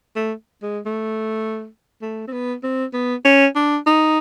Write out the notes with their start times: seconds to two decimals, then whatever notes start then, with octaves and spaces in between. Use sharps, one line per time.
0.16 A3
0.63 G#3
0.86 A3
2.02 A3
2.28 C4
2.33 B3
2.63 C4
2.94 B3
3.25 C#4
3.56 D4
3.86 D#4